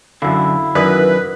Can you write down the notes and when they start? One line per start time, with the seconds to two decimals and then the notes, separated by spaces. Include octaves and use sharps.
0.22 F#2 D3 E4 F5
0.75 F#2 D#3 A#4 B4 D5 D#6